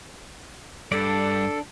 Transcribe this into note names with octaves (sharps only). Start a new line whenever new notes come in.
G2 D4 A4 D5